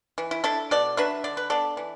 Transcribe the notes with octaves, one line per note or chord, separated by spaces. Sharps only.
E3
E4
D4 E4 A4
B2 A4 D5
F#3 D4 B4 E5
D3 D5
B4
B3 D4 A4 D5
E3